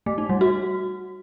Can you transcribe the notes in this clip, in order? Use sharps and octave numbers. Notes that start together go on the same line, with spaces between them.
A3
D#4
G3
F#4